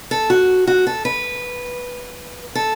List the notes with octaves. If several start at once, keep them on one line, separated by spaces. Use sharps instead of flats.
A4
F#4
F#4
A4
B4
A4